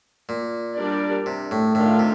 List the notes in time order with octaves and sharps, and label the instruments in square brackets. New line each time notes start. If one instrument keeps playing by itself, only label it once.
[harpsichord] A#2
[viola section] G3 D4 G4 A#4 D5
[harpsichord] C3
A2
[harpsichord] A2 [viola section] D#3 A3 D4 F4
[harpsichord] C3